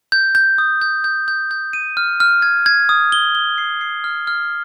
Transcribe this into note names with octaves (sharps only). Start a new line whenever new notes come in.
G6
G6
D#6
G6
G6
G6
G6
D#7
F6
F6
G#6
G#6
D#6
G7
G7
C7
C7
F6
F6